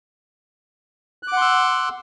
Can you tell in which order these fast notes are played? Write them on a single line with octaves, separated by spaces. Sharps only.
F#6 D6 F#5 C6 E6